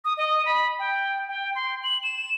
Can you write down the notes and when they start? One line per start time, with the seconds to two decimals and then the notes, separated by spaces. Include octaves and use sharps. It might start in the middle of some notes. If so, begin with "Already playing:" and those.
0.05 D#6
0.17 D#5
0.46 B5
0.79 G5
1.28 G5
1.55 C6
1.83 F#7
2.03 E7